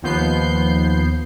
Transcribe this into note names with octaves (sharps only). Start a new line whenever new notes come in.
D#2 F3 B3 G6 C7